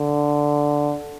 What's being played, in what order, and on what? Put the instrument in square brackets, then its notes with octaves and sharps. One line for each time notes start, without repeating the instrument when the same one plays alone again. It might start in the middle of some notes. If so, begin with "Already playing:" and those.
Already playing: [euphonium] D3